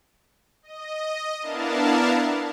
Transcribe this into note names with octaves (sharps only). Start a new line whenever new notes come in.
D#5
B3 D4 E4 A#4 F5 A5